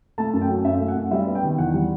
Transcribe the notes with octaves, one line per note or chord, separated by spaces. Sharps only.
A3 A5
F#2
G5
F#3
F#2 E5
A3
F#5
F#2
G3 E5
B3
G5
D#3
E2 F#5
G3